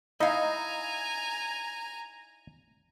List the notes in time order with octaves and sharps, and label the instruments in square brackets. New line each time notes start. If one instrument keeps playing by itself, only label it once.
[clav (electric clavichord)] D#4 E4 [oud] D#5 F5 [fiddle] G#5 A#5